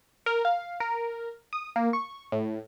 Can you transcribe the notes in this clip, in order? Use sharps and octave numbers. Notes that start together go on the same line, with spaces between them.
A#4
F5
A#4
D#6
A#3
C#6
A2